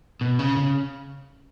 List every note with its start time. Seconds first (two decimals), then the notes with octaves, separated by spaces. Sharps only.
0.21 B2
0.39 C#3
0.57 C#3